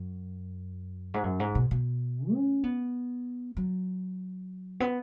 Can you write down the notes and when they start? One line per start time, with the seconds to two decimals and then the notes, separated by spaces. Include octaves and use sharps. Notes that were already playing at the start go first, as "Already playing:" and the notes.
Already playing: F#2
1.14 G#2
1.24 F#2
1.40 G#2
1.55 B2
1.71 B2
2.33 C#4
2.64 B3
3.57 F#3
4.80 B3